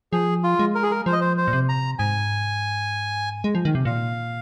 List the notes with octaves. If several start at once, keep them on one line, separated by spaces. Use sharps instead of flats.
F3 G#4
F4
G#3
A#4
G#4
A#4
F3 C5
D#5
C5
C5
A#2
C3
A#5
G#2 G#5
G#3
F3
D#3
C3
A#2 F5